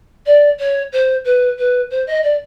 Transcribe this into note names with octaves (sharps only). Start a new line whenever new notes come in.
D5
C#5
C5
B4
B4
C5
D#5
D5